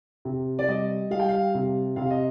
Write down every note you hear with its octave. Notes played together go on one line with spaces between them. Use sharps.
C3
D5
G3 D#5
G3 F5
G5
F5
C3
C3 F5
D#5